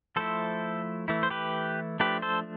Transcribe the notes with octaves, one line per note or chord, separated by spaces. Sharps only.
F3 A3 E4 A4 C5
E3 A3 E4
C5
G4 B4
F3 A3 D4 G4 B4
A4 C5